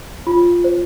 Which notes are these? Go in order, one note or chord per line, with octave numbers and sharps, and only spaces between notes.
F4
C5